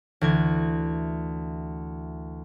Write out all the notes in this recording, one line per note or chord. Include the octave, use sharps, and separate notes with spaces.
D2 E3 G#6